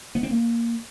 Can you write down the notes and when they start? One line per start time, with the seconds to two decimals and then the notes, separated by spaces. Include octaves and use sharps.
0.15 B3
0.23 C4
0.31 A#3